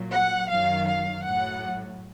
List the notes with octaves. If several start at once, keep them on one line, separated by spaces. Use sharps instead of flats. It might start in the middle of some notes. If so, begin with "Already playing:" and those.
Already playing: A#2 F#3
F#5
F#2 D#3 F#3 F5
F5
A2 F#3 F#5